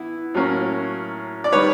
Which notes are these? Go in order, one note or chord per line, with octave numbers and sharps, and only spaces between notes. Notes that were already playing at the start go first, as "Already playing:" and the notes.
Already playing: E3 B3 E4
A2 F#3 A#3 C#4
D5
D#3 G3 B4 C#5